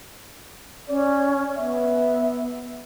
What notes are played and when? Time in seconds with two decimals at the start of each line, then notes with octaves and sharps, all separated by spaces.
0.89 C#4 D5
1.57 B3 E5